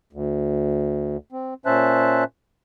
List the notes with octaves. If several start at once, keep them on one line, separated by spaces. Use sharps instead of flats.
D2
C4
A#2 C#4 C5 E5 A5 F#6